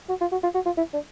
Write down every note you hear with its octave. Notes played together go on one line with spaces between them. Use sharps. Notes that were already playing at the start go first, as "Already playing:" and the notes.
F#4
F4
F#4
F4
F#4
F4
E4
D4